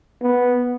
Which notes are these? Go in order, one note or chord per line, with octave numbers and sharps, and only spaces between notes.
B3